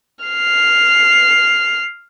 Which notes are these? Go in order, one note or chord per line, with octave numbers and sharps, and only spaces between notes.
F6 C7